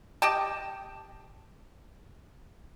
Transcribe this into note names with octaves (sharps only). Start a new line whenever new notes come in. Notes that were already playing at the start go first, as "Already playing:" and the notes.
G4 D#5 G5 A5